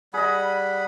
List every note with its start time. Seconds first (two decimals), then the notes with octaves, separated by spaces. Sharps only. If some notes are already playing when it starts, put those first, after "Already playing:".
0.14 G3 G#4 D#5 F#5 B5